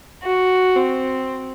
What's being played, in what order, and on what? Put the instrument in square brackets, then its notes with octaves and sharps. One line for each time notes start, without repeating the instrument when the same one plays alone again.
[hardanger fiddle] F#4
C4